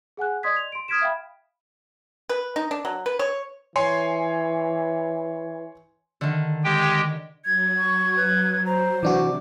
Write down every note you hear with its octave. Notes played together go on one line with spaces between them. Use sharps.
G#4 F#5 G#5 F#6
D5 D#5 C6 D#6 G#6 B6
F7
C6 D7
D#6 F6 G#6 B6 D7 E7
E5 F5 G5 B5
B4
D#4
D4
F#3
B4
C#5
E3 C#5 G#5 C6
D3 D#3
G#3 G4 G5
F#3 G#6
C#6
B4
C5 A#5
C3 E3 D4 F#4 D6